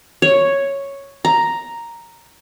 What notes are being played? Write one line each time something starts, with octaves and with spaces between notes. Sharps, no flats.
C#5
A#5